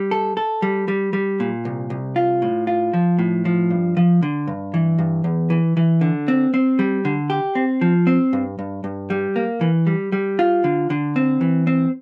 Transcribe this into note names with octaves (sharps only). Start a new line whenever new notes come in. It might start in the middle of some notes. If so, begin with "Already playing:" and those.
Already playing: G3
A4
A4
G3
G3
G3
A#2
C2
C2
F4
A2
F4
F3
A2
F3
G2
F3
D3
G2
E3
G2
E2
E3
E3
D3
C4
C4
G3
D3
G4
C4
F3
C4
G2
G2
G2
G3
A#3
E3
G3
G3
F4
D3
D3
C4
E3
C4